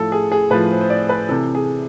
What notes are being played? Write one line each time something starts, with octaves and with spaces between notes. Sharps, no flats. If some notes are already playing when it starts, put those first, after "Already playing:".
Already playing: A2 F3 A4
G#4
G#4
A2 F3 B4
C5
C5
D5
B4
C3 E3 A4
G#4